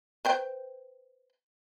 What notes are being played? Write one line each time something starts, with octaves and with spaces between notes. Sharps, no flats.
B4 C5 G5